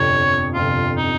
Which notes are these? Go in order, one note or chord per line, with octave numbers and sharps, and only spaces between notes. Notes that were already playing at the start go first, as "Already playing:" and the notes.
Already playing: G1 F2 C3 C#5
G1 F2 C3 F4
D#4